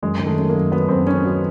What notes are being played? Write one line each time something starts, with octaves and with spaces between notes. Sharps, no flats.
F#2 G#3
D#3
A3
F#2
F#3 A#3
F#3 B3
F#2 C4
F#2 C#4
F#3